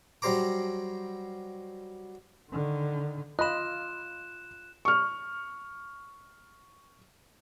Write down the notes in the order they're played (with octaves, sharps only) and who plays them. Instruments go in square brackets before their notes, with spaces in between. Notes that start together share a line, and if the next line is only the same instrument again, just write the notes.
[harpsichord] F#3 G3 G4 C5 A#5 D6
[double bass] D3 D#3
[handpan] F4 [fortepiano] D#5 B5 [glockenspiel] F#6 E7
[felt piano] C#6 F6